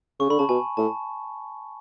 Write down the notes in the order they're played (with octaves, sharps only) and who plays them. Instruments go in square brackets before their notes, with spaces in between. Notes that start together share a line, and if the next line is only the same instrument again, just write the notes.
[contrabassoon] C#3 [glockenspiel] C#6
[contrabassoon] D3 [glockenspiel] B5
[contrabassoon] C#3 [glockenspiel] A5
[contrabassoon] B2 [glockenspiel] G#5
[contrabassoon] A2 [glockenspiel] A5